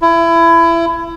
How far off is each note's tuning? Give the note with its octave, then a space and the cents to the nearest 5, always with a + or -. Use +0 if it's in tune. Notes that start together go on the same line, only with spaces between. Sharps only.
E4 +25